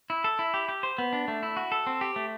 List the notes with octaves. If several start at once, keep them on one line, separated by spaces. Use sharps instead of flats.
E4
A4
E4
G4
G4
C5
B3
D4
A3
E4
F#4
A4
C4
G4
A3